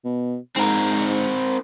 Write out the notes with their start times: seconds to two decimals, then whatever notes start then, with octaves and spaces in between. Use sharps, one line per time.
0.05 B2
0.56 G#2 C4 A#4